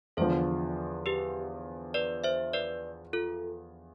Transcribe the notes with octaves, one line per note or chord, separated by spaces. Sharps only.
E2 D3 F3 A4 C5
G4 B4
B4 D5
C5 E5
B4 D5
F4 A4